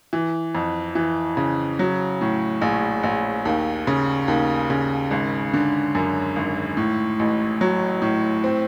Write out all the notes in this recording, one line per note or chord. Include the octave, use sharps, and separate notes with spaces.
E3
F2
E3
C#3
F#3
A2
A#1
A#1
D#2
C#3
D#2
C#3
G#1
D3
F#2
G#1
A2
A1
F#3
A2
C4